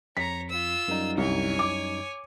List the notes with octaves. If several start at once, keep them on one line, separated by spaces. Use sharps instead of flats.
F2 C#5 A#5 B6
F4 E6
F#2 G3 D#4
C2 C#5 G#5
D6